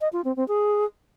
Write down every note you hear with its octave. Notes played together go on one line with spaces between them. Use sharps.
D#5
F4
C4
C4
G#4